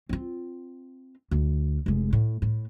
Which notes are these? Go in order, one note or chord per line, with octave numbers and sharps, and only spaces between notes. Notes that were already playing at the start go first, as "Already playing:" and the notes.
C4 F4
D2
F1 G#3
A2
A2